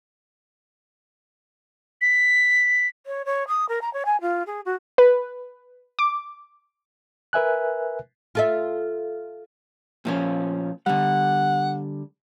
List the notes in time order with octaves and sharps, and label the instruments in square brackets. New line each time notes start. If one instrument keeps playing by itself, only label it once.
[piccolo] B6
[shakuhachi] C#5
C#5
D#6
A#4
A#5
C#5
G#5
F4
G#4
F#4
[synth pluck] B4
D6
[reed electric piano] A#4 B4 E5 G#5 F#6
[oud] F4 A4 E5
[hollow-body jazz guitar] A#2 F3 C#4
[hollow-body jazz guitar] D3 G3 [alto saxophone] F#5